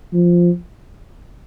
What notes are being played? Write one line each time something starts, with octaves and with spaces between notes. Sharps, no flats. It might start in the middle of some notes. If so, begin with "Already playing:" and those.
F3